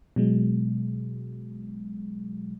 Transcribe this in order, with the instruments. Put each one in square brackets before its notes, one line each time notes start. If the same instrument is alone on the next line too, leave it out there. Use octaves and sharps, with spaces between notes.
[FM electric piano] B2 F#3 G#3